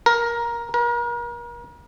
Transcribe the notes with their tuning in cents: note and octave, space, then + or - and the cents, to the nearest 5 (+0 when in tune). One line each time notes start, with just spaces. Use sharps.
A#4 +15
A#4 +40